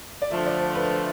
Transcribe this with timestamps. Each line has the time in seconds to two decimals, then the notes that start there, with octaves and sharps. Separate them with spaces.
0.22 D5
0.30 D3 F3 A3 E5
0.46 D5
0.60 C5
0.75 B4
0.90 C5